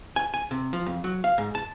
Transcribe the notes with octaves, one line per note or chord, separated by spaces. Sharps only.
G#5
G#5
C3
F3
F2
F#3
F5
G#2
A5